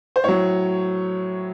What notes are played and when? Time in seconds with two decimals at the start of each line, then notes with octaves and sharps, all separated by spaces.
0.16 C5
0.24 A2 F#3 C#5